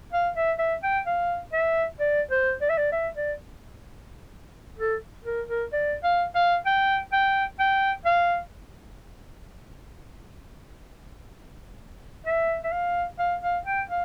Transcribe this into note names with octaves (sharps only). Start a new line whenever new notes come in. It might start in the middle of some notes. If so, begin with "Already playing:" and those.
F5
E5
E5
G5
F5
E5
D5
C5
D5
E5
D5
E5
D5
A4
A#4
A#4
D5
F5
F5
G5
G5
G5
F5
E5
E5
F5
F5
F5
G5
F5